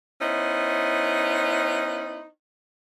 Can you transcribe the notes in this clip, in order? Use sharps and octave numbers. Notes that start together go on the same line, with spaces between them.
B3 C#4 D#4 E4 C5